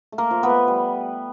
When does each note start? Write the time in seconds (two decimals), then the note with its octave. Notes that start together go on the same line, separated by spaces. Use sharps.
0.12 A3
0.18 A#3 A#4
0.31 F3
0.43 B3 B4
0.49 A3
0.68 G3